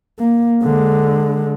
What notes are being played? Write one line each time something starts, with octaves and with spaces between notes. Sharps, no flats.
A#3
D3 G#3